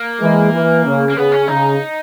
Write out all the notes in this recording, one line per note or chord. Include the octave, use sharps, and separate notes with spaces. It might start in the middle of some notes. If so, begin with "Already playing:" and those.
Already playing: A#3
E3 G#3
E3
C#3
A#3
C#3 B3
C#4
C#3 D#4